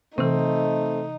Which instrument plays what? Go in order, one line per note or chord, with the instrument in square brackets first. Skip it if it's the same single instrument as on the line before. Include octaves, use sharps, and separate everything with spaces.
[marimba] C3 E3 [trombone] A3 [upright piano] C4 [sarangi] D#4